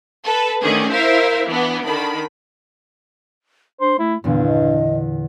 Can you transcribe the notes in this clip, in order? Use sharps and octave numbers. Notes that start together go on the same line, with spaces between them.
A4 B4
D3 D#3 A3 C#4 G#4
E4 A#4 C5 E5 F5
E3 B3 D4
D3 D#3 B5
D4 C5
A3 E4
E2 G2 A#2 D3 B3
D#5